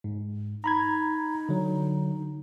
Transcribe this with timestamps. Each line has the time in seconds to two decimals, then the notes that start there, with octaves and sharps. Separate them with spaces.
0.04 G#2
0.64 D#4 A#5 B5 G#6
1.49 D3 F#3